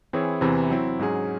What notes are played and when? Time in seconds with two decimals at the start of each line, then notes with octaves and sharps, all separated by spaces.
0.13 E3 C4 E4 G#4 C#5
0.41 E2 C3 E3 C4 E4
0.70 F#3 C4 E4
0.99 G#2 F#3 C#4 G#4